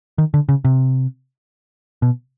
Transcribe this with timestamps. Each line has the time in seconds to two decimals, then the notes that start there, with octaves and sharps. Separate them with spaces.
0.18 D#3
0.34 D3
0.49 C#3
0.65 C3
2.02 B2